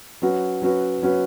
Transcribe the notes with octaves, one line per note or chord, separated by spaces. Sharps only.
F#3 C#4 F#4 B4
F#3 C#4 F#4 B4
F#3 C#4 F#4 B4